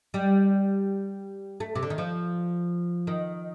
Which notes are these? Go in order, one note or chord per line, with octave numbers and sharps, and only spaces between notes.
G3
A3
C3
D3
D#3
F3
D#3